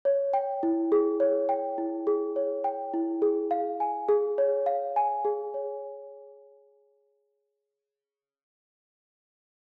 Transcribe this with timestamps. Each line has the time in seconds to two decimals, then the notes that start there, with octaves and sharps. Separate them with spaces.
0.05 C#5
0.33 G5
0.63 E4
0.92 G#4
1.20 C#5
1.49 G5
1.78 E4
2.07 G#4
2.36 C#5
2.64 G5
2.94 E4
3.22 G#4
3.51 F5
3.80 G#5
4.08 G#4
4.38 C#5
4.66 F5
4.96 G#5
5.25 G#4
5.54 C#5